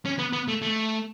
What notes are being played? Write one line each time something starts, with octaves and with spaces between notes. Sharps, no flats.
C#4
B3
B3
A3
A3